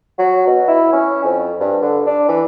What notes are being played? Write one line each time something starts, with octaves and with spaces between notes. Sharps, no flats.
F#3
B2
E4
C#4
F2
G2
D3
D4
E3